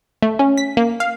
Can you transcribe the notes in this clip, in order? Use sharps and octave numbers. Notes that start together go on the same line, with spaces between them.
A3
C#4
B6
A#3
F5